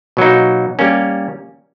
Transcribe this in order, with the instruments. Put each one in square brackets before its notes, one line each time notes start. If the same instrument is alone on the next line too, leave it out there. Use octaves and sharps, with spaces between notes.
[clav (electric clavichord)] B2 F#3 A#3 D#4
G3 A#3 C#4